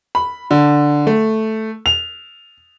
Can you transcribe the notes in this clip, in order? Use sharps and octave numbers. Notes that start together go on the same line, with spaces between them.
B5
D3
A3
F7